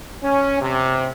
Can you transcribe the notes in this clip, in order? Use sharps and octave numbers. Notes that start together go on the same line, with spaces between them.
C#4
C3